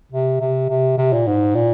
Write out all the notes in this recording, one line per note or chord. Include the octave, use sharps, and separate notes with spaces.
C3
C3
C3
C3
A#2
G#2
A#2